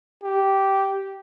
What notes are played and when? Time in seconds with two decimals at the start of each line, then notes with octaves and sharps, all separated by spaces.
0.23 G4